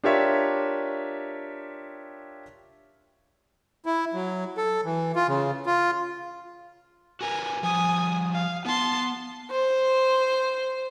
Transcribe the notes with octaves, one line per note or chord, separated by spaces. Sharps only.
D4 F4 G4 A#4 C#5 E5
E4
F#3
A4
E3
F4
C#3
F4
F#4 A#4 B4 G#5
F3 G3 G#5 D#6
F5
B3 A5 C6
C5